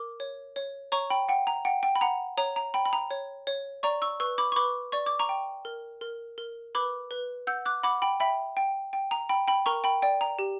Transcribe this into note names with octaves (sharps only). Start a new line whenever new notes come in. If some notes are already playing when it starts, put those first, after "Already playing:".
Already playing: A#4 D6
C#5
C#5
C#5 A#5 C#6
G5 B5
F#5 G5
A#5
F#5 G5
G5
B5
F#5 A#5
C#5 A#5
A#5
G5 B5
B5
A#5
C#5
C#5
D5 A#5 C#6
C#6 E6
B4 C#6 E6
B5 D6
C#6
B4 B5 D6
D5 C#6
D6
A#5 C#6
G5
A#4
A#4
A#4
B4 B5 D6
B4
F#5 E6 G6
D6 F#6
F#5 B5 D6
G5 B5
E5 G5 B5
G5
G5
A#5
G5 B5
G5 B5
A#4 A#5 C#6
G5 B5
D5 G5
A#5
G4